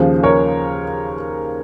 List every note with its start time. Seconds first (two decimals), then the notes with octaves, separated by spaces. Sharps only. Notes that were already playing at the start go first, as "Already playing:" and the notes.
Already playing: D#2 C#3 F3 G#4 C5
0.23 A#4 C#5